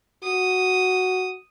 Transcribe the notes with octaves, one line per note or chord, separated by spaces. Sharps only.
F#4 D#6